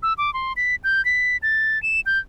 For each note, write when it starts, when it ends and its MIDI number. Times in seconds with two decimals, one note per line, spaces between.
0.03 0.13 88
0.18 0.33 86
0.34 0.53 84
0.57 0.75 95
0.84 1.04 91
1.05 1.37 95
1.43 1.81 93
1.83 2.00 100
2.06 2.19 91